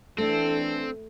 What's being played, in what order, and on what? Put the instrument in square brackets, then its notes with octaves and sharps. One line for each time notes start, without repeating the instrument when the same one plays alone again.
[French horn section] E3 D4 [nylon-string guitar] A3 [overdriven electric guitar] C4 [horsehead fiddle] A4